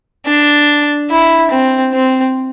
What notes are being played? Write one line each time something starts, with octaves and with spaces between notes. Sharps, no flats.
D4
E4
C4
C4